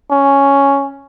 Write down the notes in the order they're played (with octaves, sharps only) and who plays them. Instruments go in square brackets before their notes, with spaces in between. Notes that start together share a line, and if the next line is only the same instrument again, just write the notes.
[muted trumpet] C#4